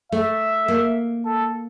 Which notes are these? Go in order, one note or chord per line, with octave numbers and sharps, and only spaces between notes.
A3 E5
A#3
A4